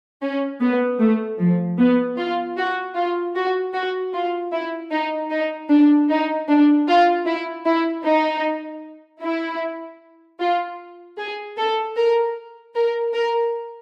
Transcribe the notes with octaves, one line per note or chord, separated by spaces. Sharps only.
C#4
B3
A3
F3
B3
F4
F#4
F4
F#4
F#4
F4
E4
D#4
D#4
D4
D#4
D4
F4
E4
E4
D#4
E4
F4
G#4
A4
A#4
A#4
A#4